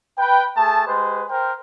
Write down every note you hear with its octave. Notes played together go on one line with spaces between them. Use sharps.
B4 G5
A3 G#4 A5
G#3 G4 B4 C5
A#4 C5 G5